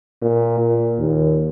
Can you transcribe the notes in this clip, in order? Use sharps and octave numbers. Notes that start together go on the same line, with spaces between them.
A#2
A#2
D#2